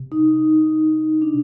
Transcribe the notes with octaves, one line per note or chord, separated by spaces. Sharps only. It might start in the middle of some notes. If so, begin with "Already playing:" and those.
Already playing: C3
D#4
D4